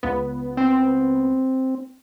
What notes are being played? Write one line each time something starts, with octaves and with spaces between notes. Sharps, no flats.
C#2 B3
C4